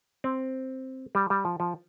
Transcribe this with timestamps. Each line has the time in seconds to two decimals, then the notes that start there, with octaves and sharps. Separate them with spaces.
0.24 C4
1.15 G3
1.30 G3
1.45 F3
1.60 F3